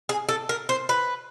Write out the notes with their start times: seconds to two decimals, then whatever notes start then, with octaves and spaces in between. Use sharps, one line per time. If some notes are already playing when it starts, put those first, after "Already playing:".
0.09 G#4
0.29 A4
0.49 A#4
0.69 C5
0.89 B4